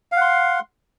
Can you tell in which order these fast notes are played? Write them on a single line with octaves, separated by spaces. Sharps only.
F5 F#5 C6